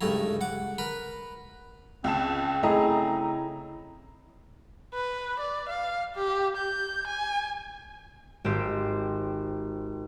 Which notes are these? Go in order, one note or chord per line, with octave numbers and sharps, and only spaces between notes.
C#2 G2 A3 E4 A#5
F#5 D6
A#4 B4 A#5 B5
C#2 C#3 C4 A5
C#3 A3 E4 G#4 D#5 A5 A#5
B4
D5
F5
G4
G6
G#5
G#1 C4 G4 C5